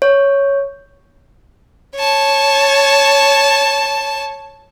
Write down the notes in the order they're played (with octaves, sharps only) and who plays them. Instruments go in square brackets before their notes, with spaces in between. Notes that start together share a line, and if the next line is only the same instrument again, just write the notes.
[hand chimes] C#5
[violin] C#5 A5